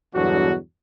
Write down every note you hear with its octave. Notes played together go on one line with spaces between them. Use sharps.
E2 G2 B2 D3 F#3 F#4